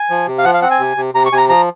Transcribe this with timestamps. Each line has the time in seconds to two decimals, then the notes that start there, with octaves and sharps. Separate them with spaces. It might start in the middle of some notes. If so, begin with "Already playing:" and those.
Already playing: G#5
0.10 F3
0.28 C3
0.39 F5
0.45 F3 F#5
0.54 F5
0.62 C4 F#5
0.71 G#5
0.80 C3
0.97 C3
1.14 C3 A#5
1.26 C#6
1.32 C3 G#5
1.38 A#5
1.49 F3 A#5